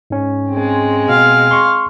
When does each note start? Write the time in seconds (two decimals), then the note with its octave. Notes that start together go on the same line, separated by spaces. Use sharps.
0.10 G#2 C#4
0.50 G#3 C4
1.09 B2 F5
1.51 C6 C#6